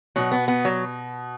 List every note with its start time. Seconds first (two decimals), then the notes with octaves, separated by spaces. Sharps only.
0.16 B2 F#3
0.32 B3
0.48 B3
0.65 F#3